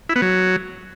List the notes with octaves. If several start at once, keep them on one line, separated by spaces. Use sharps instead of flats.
E4
B3
F#3